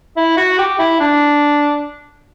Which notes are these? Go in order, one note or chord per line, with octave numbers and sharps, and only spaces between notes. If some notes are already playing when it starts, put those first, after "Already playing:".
E4
F#4
G4
E4
D4